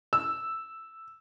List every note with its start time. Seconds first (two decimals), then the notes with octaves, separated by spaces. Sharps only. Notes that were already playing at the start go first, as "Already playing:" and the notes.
0.13 E6